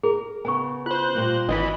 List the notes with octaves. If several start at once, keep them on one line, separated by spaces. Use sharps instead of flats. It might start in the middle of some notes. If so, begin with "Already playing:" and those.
G#4 A#4
C#3 B3 G#5 C#6
F4 C5 F#6
A#2 G3 A#3
G#1 E3 D4 D#5 B5